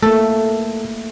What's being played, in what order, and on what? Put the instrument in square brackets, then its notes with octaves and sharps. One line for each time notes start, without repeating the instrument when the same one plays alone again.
[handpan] A3 A#3 [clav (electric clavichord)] A4